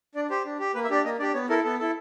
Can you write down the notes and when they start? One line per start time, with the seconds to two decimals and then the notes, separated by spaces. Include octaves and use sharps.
0.15 D4 D5
0.30 G4 C5
0.45 D4
0.60 G4
0.75 A#3 B4
0.84 E5
0.90 D4 G4 D5
1.05 A#3 D#5
1.19 D4 D5
1.22 G4
1.34 B3 C#5
1.49 E4 A4 A#4
1.64 B3 A4
1.79 E4 A4